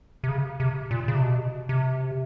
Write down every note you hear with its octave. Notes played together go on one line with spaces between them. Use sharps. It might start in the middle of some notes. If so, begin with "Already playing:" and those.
C3
C#3
C3
A#2
C#3
C3
B2
C3